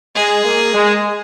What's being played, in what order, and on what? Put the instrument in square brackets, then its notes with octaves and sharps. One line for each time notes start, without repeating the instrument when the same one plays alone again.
[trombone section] G#3 [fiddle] G#4
[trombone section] A#3
G#3